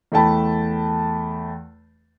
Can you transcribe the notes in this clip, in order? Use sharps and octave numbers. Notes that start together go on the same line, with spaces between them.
E2 A3 G5 A5 B5